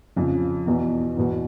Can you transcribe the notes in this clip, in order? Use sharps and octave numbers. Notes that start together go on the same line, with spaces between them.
F2 C#3 F3
E2 B2
E2 B2